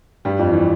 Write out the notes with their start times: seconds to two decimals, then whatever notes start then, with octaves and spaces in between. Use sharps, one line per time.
0.25 G2 G3
0.39 F2 F3
0.52 E3